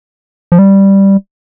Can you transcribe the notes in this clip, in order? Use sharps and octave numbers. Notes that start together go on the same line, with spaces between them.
F3
G3